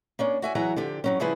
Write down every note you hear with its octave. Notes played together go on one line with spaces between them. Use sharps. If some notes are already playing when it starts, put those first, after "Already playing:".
A#3 C#4 D4
F#4 E5 G#5
E3 F#3 G#4 E5 F#5 A#5
D3 F3 G4
G2 F#3 C#4
C#3 F3 G3 E4 G#4 B4